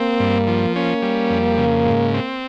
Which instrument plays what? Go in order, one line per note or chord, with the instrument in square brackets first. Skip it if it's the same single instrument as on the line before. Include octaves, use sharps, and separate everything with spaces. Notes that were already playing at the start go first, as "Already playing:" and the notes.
Already playing: [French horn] A#3 [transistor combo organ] C4
[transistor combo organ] G2
F3
[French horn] A#3 [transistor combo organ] C#4
[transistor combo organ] G3
F2
C#3
G#2
C4